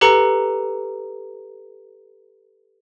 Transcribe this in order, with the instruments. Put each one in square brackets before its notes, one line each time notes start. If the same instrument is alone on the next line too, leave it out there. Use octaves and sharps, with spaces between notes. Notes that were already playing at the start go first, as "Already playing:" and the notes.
[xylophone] G4 A4 B4 A#5 C#7